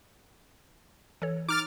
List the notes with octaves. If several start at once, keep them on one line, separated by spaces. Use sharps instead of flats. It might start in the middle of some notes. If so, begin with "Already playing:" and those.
E3 A4 C#5
D#4 D6 F6 A6